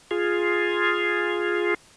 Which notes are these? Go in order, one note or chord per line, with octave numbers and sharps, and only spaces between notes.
F4 G#4